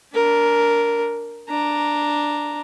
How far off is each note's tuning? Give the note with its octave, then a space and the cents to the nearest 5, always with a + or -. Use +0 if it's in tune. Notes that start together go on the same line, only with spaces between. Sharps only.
D4 -25 A#4 +0
D4 +0 A#5 +0